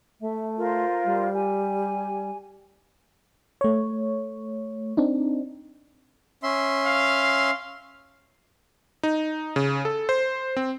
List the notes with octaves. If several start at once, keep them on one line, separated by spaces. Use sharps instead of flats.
A3 E5
F4 A#4 C5
G3
G4 G#5
A3 C#5
C4 D4 D#4
C#4 E5 C6
F5
D#4
C#3
A4
C5
C4